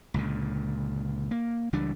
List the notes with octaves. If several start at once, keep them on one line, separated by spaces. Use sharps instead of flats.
C#2 A#2 D3
A#3
C#2 E3 G3 D4